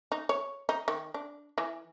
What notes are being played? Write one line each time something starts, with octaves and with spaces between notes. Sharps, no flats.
D#4
C#5
D#4
D#3
D4
E3